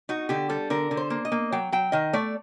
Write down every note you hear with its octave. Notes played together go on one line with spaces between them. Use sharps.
D#4 F#4
D3 G4
G3 A4
D3 A#4
D3
C5
A#3
D#5
A#3
F#3 G5
F#3 G5
D#3 D#5
A3 D5